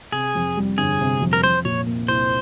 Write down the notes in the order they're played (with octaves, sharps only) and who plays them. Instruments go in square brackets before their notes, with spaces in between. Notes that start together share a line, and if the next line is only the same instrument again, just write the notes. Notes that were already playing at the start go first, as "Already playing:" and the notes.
[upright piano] C3 [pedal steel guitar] G#4
[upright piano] F2
G3
[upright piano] G1 [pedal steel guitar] G#4
[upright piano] C3
F2
[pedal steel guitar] A#4
[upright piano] F3 [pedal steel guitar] C5
[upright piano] A#2 [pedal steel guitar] C#5
[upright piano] A#3
[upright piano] C2 [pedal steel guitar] C5